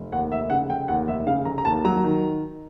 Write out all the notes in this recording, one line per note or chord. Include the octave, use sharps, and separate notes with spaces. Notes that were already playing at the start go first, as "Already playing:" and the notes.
Already playing: F1
D#2 F#5
F1 E5
C#3 F#5
F1 G5
D#2 F#5
F1 E5
C#3 F5
F1 A#5
A#5
D#2 A5
F#3 A#5
D#3